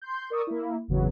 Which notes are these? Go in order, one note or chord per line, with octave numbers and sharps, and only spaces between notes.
C6 G6
A#4 D5 C#6 D#6 E6
A#3 E4
G1 E2 C#3 F#3 B3